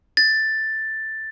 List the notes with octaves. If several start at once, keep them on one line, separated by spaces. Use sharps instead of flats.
A6